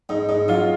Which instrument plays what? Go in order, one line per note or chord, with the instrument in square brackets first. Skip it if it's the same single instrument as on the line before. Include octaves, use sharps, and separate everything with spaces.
[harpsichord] G#2 [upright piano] D#4
[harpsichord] G#2 [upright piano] D#4
[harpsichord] F#3 [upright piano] F4